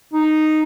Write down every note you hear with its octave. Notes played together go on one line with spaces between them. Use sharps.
D#4